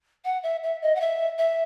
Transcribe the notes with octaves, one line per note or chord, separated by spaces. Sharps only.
F#5
E5
E5
D#5
F#5
E5
E5